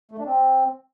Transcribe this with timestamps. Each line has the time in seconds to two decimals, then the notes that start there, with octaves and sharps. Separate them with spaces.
0.11 A3
0.19 D4
0.26 C4